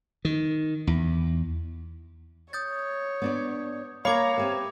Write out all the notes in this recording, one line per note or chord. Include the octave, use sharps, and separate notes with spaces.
D#3
E2
C#5 D#6 G6 A6
B3 D4 D5
A#3 A#4 C#5 F5 A#5 B5 D6 G#6
C4 G4 B4 E5